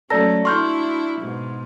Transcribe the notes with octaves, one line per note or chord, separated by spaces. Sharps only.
F#3 A3 C#4 A4 D5 A#5 A#6
D4 E4 F#4 C6 C#6 F6 G6
G#2 B2